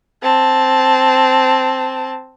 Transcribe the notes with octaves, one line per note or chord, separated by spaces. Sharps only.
C4 A5